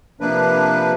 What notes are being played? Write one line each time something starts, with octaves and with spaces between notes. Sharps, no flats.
C3 F3 A#3 D4 B4